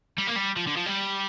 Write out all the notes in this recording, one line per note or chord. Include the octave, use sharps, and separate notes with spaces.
G3
A#3
G3
F3
D3
F3
G3